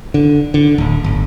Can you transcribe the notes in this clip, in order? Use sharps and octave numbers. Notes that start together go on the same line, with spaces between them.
D3
D3
D1
G1